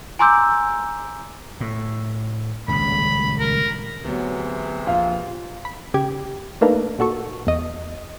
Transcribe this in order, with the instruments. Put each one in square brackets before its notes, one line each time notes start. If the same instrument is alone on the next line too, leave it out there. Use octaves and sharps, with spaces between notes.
[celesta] G#5 A#5 C6 D6 E6 G6
[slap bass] A2
[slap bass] D#1 C#2 C#3 [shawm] B5
[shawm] A#4
[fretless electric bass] D2 F#3 [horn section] C3 E3 G#4 [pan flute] B3
[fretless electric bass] A#1 F2 [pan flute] F4 [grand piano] F5
[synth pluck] B5
C#3 G4 G#6
A3 A#3 D4 D#4 A#4 B4
A#2 F#4 A4 C#6
E2 D#5